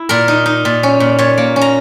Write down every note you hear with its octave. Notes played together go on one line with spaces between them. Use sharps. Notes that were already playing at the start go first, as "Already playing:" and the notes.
Already playing: E4
A#2 A#4
D#4
D#4
A#2
C#4
A#2
A#2 C#5
A#3
C#4
A#5